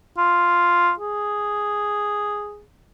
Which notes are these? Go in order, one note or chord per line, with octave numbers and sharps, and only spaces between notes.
F4
G#4